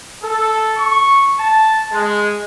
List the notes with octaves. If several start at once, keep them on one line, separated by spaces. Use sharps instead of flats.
A4
C#6
A5
G#3